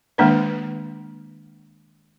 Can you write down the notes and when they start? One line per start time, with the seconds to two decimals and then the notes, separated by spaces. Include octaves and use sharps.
0.18 D#3 G#3 A#3 D4 B4